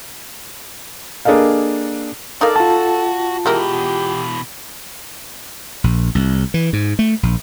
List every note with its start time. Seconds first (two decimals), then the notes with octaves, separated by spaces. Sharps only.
1.25 A#3 D4 G#4 A4 D#5 F5
2.41 D#4 A4 A#4 D5 F5
2.56 F4 F#4 A5
3.46 B2 E3 G#3 E4 G4 A#4
5.84 A#1
6.15 C2
6.54 E3
6.73 G#2
6.99 A3
7.23 A#1